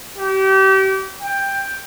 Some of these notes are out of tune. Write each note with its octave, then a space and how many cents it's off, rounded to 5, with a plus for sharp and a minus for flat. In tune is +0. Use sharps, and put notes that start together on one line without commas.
G4 -35
G5 +10